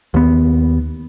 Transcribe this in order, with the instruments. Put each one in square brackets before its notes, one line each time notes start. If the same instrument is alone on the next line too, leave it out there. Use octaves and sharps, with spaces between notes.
[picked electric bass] D#2 B3